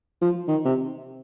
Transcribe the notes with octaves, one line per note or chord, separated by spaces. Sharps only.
F3
D#3
C3